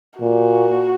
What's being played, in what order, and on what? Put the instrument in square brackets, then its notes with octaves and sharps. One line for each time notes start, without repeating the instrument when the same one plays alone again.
[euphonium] A#2 [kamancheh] F#4